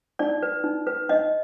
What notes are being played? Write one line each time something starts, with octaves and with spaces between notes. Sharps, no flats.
D#4 D5
B4
D#4
B4
D#4 D#5